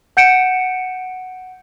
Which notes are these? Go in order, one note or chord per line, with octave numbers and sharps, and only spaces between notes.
F#5 G6 C#7 D7 E7